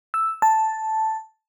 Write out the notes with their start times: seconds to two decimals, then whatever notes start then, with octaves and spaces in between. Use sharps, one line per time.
0.14 E6
0.42 A5